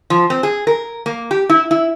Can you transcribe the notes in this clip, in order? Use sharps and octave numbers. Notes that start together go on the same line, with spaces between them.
F3
C4
G#4
A#4
A#3
G4
E4
E4